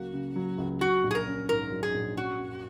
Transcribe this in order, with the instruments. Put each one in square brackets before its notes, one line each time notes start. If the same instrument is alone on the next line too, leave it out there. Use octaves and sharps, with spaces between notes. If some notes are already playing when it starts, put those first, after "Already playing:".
Already playing: [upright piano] C#2 F#3 A#3 [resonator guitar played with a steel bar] F#4
[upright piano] C#3
F#3
C#2
[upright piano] F#3 [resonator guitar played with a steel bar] F#4
[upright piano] A#1
[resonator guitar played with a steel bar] G#4
A#4
[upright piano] C#4
[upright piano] G#2 [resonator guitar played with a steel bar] A#4
[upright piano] F#3
[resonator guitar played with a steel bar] G#4
[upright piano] A#1
[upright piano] C#4 [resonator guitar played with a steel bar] F#4
[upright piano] F#2